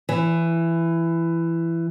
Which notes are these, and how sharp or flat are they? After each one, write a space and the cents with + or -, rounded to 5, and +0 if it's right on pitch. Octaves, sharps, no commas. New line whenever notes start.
E3 +15